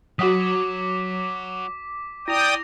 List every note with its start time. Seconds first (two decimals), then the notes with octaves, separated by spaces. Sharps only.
0.19 F#3 F#4 C#5 F#5 D6 D#6 B6
2.28 E4 D5 G5 D#6 A#6 F7